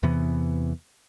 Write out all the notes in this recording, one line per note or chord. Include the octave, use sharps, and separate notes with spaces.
E2 C3 E3 B3